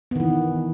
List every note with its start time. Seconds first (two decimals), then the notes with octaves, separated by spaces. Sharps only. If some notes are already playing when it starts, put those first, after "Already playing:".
0.11 B3
0.16 D#3
0.20 E3